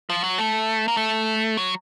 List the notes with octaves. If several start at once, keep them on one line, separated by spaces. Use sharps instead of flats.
F3
F#3
A3
A#3
A3
F#3